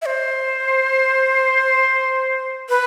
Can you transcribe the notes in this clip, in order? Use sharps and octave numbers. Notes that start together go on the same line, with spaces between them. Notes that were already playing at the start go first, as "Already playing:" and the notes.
E5
C5
B4